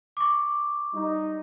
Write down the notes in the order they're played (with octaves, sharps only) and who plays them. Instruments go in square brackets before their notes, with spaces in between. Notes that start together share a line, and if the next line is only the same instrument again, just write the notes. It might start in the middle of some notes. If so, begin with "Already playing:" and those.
[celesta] C#6 D6
[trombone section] G3 D#4